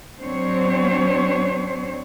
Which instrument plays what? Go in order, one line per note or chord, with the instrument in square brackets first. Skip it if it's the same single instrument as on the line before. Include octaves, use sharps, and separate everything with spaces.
[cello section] F#3 C4 D4 C5 C#5